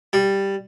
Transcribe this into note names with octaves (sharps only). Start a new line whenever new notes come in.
G3